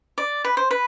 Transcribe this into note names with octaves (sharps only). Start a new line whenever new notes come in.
D5
B4
C5
B4